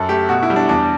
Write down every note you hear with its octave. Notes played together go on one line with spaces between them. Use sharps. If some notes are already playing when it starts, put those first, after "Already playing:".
Already playing: F#2 A4
A3 G4
B2 F#4
E4
G3
D4
E2 D4